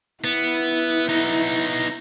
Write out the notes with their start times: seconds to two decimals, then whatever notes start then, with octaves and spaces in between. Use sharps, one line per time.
0.24 B3 E4
1.09 B3 D#4